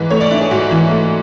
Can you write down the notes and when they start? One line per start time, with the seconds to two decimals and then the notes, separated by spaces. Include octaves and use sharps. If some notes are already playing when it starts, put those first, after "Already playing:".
Already playing: G#2 E3 B4
0.10 A3 C#5
0.21 D5
0.31 D4 E5
0.41 G#4
0.51 G#2 F#4
0.71 E3
0.91 A3